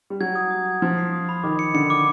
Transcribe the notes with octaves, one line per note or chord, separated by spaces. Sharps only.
G3
F#3 G#6
D#6
D#6
G#6
F3 G#6
C7
D#6
B5
D#3 D6
C#7
D3 C#7
D6